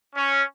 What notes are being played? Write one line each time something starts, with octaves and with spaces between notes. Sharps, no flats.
C#4